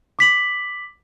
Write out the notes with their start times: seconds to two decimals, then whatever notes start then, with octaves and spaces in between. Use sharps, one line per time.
0.19 D6 B6 F#7